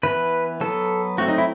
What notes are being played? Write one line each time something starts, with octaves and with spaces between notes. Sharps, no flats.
E3 B3 B4
F#3 B3 A4
F#3 A3 C4 F#4
D#4
E4